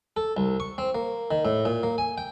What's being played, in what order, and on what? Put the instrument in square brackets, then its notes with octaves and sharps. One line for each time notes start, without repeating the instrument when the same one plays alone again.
[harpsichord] A4
C2
C#6
C4
A#3
D#3
A2
A#2
A#3
G#5
G5